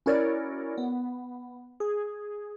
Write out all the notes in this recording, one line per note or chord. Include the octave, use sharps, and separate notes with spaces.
C#4 E4 F#4 A#4 C#5 D5
B3
G#4